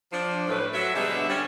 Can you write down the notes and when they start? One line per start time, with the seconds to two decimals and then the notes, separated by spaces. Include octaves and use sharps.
0.13 F3 D4
0.48 F#2 A2 B4
0.74 F#3 E5
0.94 B2 D3 G3 G#3 B3 E5
1.28 G3 C#4